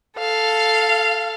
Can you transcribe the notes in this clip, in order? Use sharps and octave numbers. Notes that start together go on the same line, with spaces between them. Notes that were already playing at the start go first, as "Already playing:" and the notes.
A4 F5